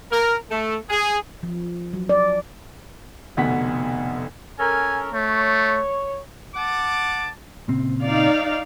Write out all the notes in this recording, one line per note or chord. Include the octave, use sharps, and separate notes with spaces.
A#4
A3
G#4
F3
F#3
D5
F1 D2 B2 F#5 B6
C#4 A4 A#4 G#5
A3 C#5
F#5 A5 D6
A#2 C#3 C4
D#4 D5 F5